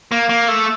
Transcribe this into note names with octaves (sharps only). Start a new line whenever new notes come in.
A#3
A#3
A3